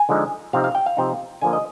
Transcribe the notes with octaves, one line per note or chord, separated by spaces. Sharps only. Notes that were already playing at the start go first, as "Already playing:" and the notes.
Already playing: G#5
D3 F3 G#3 D#4
C3 F3 C4 D#4 F5
F5
G5
F5
C3 F3 C4 D#4
D3 F3 A#3 G#5
D#5